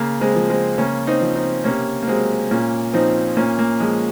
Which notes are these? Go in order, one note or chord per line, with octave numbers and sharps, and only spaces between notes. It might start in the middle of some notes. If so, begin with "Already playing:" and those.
Already playing: C#3 A#3
G#3 C4
F3
G#3 C4
C#3 A#3 C#4
C4 D#4
F3
C4 D#4
C3 A#3 C#4
A#3
F#3 G#3 C4
A#2 A#3 C#4
F3 C4 D#4
A#2 A#3 C#4
A#3
F3 G#3